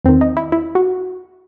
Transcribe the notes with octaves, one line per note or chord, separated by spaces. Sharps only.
E2 D#3 C4
D#4
E4
E4
F#4